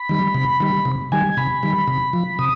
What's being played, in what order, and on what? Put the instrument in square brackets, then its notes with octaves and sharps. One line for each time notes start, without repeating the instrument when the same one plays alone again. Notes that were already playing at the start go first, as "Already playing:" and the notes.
Already playing: [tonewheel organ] B5
D#3 G3
C3
D#3 G3
C3
D#3 G3 G#5
C3 B5
D#3 G3
C3
F3
C3 D#6